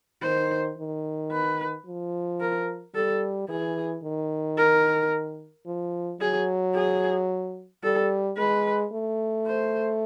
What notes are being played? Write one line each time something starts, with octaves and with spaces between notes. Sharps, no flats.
D#3 C5
D#3
B4
F3
A#4
G3 A4
E3 G#4
D#3
A#4
F3
F#3 G#4
G#4
G3 A4
G#3 B4
A3
C5